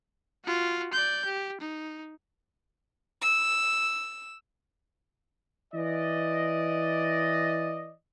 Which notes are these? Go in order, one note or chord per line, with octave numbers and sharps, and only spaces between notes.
F4 F#4
D5 G6
G4
D#4
E6
E3 D5 D#5